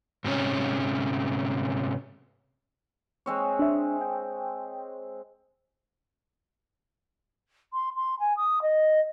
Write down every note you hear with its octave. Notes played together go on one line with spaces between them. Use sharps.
G#2 C3 C#4
G#3 C4 C#5
D4 E5
G5
C6
C6
G#5
D#6
D#5